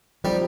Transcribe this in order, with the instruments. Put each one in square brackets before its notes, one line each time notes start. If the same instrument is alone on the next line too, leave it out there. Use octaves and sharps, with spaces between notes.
[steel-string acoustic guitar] F3 C4 D#4 G4 [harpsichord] G3